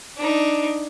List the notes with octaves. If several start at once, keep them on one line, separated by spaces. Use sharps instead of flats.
D4 D#4